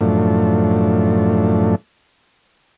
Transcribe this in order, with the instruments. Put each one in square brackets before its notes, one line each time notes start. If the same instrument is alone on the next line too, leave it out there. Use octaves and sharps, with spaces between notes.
[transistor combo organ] F#2 A2 F3 A3 D4